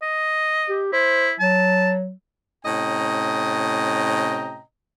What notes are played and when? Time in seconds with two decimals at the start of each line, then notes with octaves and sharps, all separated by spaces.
0.02 D#5
0.69 G4
0.93 E4 C5
1.40 F#3 A5
2.65 A2 C3 C#4 D#5 G5 A#5